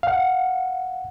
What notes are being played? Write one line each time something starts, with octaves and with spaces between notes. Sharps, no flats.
F5 F#5